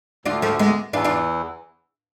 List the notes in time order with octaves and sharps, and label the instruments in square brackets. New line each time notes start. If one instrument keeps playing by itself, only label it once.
[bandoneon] D2 D3 [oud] D4 F4
[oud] F3 A3
G#3 B3
[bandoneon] E2 E3 [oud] D4 F4
[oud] D4 F4